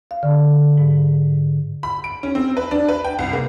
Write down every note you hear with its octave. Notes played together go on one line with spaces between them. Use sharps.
F5
D3
G#2
B5
D7
C#4
C4
B4
D4
B4
G5
C2
A#3